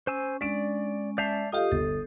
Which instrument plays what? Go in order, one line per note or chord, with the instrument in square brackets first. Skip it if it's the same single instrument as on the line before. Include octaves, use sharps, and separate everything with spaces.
[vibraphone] C#4 [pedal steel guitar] C5 G#5 E6
[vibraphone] G#3 C#4 [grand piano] D4 D7 [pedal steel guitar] D5
[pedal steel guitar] D5 E5 A5 [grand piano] G6 C7 F7
[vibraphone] F4 G4 [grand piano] A4 D#5 F5 [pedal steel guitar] D#6
[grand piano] G1 [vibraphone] A4